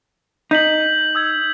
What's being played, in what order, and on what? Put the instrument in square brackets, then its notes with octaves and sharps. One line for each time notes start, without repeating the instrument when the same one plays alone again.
[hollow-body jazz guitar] D#4 [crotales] G6 B6 F#7
[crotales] D#6 E6 G#6